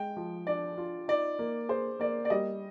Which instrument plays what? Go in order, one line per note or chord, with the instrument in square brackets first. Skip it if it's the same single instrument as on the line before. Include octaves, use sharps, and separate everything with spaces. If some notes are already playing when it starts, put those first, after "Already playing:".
Already playing: [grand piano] G#3 [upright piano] G5
[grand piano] F3
[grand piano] D4 [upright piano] D5
[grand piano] F4
[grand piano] D#4 [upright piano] D5
[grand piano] A#3
[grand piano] G#4 [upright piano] C5
[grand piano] A#3 [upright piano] D5
[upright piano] D5
[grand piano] G3 [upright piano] D#5